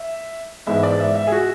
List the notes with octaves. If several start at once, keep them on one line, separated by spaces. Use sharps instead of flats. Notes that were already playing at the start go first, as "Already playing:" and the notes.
Already playing: E5
G#2 E3 G#3 B3 E5
D5
E5
E5
G#4
F#4